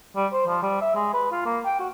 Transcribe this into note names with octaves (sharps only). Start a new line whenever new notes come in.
G3
C5
F3
G3
E5
G#3
B4
F4
A#3
G5
F#4